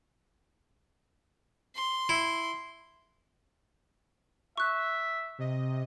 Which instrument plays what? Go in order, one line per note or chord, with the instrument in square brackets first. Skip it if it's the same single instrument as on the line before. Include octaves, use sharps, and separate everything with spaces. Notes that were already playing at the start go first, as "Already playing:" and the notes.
[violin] C6
[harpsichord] E4
[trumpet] E5 [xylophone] C#6 F#6
[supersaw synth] C3 D#5